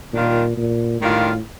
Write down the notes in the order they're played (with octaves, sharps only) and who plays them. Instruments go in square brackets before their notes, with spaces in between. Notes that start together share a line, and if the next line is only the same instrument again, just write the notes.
[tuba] A#2 [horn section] D#3 G3 D4 F4
[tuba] A#2
[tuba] A2 [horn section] D#3 G3 D4 F4